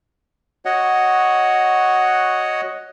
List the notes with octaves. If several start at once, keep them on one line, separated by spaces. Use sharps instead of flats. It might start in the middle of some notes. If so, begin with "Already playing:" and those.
F#4 C#5 D#5 F#5